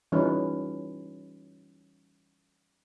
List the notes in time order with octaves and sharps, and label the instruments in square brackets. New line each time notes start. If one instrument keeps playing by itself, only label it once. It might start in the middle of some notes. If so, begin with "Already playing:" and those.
[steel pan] E3 G3 C#4 D#4 F4 B4